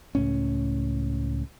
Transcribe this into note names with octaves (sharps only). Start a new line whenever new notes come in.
C#2 A2 C#4